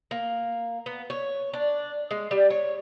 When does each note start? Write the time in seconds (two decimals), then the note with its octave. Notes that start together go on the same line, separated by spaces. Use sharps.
0.11 A#3
0.86 B3
1.10 C#5
1.53 D4
2.11 G#3
2.31 G3
2.50 C#5